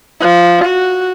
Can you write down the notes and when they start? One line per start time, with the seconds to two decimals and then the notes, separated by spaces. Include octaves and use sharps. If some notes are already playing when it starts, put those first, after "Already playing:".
0.21 F3
0.65 F#4